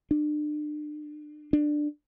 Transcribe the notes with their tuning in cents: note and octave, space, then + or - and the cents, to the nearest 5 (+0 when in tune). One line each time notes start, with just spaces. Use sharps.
D4 +35
D4 +15